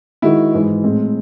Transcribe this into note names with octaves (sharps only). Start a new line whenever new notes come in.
D#3 G#3 D#4 E4 F#4
G#2 E3 G#3
A2 G#3 C4